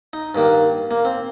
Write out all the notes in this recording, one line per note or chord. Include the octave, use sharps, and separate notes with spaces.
D#4
G2 D#3 A#3
A#3
C4